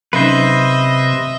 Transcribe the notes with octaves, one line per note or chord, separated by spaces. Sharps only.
C3 F#3 C#4 D#4 B4 C5 D#5 E5